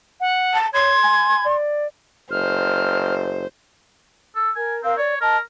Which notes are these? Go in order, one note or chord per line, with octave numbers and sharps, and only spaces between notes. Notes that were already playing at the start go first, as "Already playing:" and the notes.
F#5
A5
C#5 C6 G#6
G#5
D5
F#1 C5 F6
A4
A#4 G#5
C4 A#4 F5
C#5 D5
A#4 D#5 A5